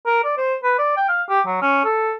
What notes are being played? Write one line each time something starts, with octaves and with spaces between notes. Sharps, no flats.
A#4
D5
C5
B4
D5
G5
F5
G4
F#3
C#4
A4